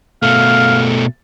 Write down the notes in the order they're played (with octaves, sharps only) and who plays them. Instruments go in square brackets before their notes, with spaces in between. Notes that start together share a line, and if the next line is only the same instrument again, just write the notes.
[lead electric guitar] B2 A3 [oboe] F5